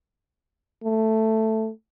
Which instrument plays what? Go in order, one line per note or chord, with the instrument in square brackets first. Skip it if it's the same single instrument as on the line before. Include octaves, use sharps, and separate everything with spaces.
[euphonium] A3